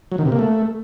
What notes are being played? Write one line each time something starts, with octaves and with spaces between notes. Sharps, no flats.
F#3
D#3
C3
A#3
A3